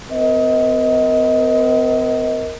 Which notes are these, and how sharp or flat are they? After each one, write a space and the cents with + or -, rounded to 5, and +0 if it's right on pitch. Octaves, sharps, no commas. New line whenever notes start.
C4 -45 A#4 +0 D#5 +25